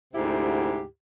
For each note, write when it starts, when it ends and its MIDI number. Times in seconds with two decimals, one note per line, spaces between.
0.14 0.82 38
0.14 0.82 44
0.14 0.82 48
0.14 0.82 64
0.14 0.82 67